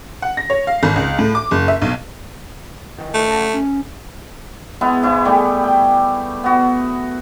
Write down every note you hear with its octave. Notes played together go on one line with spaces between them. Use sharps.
F#5
A#6
C#5
F5
G#1
C#2
A2
D6
F#1
E5
B1
D#3 E3
A3
C#3 A5
C#4
G#3 B3 E4
G#2 E4 C#6
G3 A3 G4
G5
B3 F#4